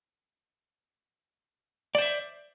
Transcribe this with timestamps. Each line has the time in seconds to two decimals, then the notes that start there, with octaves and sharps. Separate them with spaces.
1.95 D5
1.98 C5
2.02 E5